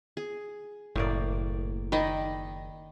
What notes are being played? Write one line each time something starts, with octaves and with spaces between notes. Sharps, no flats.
G#4
F#1 A2 A#3 D5
D#3 D5 D#5 B5